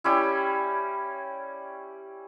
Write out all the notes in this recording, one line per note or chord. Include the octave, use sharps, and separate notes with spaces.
G3 C#4 E4